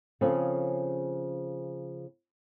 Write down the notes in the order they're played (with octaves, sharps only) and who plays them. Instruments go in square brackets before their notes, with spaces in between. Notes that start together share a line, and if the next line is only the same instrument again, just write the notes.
[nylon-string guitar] C#3 F3 C4 C#4 G#4 A4